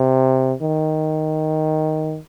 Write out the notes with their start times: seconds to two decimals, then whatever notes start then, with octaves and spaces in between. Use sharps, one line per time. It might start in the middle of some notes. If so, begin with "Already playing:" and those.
Already playing: C3
0.62 D#3